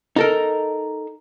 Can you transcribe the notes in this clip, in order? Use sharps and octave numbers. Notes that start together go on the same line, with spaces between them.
D#4 A4 A#4